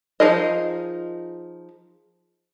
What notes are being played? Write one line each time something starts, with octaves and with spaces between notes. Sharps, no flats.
F3 D#4 G#4 A#4 D#5